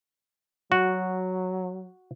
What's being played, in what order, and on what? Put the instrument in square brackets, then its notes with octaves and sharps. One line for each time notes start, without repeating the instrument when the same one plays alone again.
[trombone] F#3 [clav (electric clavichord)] F#4